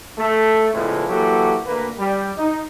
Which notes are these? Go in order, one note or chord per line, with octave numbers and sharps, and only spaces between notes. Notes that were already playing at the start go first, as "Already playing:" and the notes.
A3
E2 A2 C#3 E3 F3 G#3
E3 F#3 A#3 F#4 G4 A4
D2 A#3 B4
G3
D#4